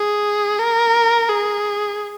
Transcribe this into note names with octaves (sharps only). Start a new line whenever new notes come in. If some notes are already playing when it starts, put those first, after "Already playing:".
Already playing: G#4
A#4
G#4